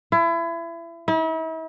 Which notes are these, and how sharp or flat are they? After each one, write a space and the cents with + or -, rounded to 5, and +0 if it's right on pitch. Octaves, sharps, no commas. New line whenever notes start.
E4 +30
E4 -40